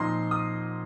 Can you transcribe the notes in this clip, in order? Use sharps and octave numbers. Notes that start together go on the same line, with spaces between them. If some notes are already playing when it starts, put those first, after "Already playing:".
Already playing: A#2 F3 C4 D#4 C6
D#6